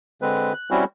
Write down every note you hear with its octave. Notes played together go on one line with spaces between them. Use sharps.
D3 G#3 C4 B4
F#6
G3 C4 C#4 E4 F#4